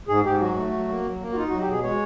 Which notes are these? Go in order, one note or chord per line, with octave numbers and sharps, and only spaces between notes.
G#2 G#4
G#2 G4
F#3 F#4
A3
F#3
A#3
F#3
A#3
F#4
D#4 F4
F#4
F#3
G4
B2 G#4
G#3 C#5